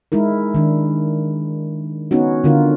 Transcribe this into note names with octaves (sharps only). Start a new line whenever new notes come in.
G#3 D#4 E4 A#4
D#3 D4
B3 C#4 D#4 F#4
D3 B3 F4 A#4